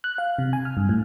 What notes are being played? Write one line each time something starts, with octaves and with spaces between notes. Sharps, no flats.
F#6
F5
C3
G#5
F6
G2
A2